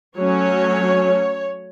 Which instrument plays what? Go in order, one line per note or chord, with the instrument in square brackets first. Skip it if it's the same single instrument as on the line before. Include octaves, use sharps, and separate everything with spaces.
[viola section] F#3 A3 C#4 C#5